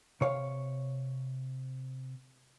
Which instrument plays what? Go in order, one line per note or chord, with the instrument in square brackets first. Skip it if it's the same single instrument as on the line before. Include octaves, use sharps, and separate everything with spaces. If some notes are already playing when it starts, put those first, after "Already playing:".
[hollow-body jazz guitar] C3 C#5 F5